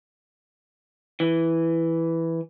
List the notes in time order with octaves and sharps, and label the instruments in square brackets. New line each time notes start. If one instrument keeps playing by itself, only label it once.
[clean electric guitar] E3